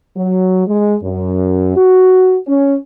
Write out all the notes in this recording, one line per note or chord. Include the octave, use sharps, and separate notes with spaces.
F#3
G#3
F#2
F#4
C#4